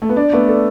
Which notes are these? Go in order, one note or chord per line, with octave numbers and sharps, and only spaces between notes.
A3
B3
D4 D5
A3 B3
A4